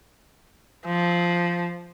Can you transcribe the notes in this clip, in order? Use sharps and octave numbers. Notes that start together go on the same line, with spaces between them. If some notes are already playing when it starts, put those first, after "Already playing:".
F3